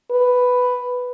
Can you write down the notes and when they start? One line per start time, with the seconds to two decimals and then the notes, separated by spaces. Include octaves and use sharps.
0.11 B4